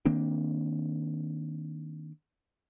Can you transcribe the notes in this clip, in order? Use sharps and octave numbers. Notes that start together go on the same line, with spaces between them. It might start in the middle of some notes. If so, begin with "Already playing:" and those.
D#3 A#3 C4 D4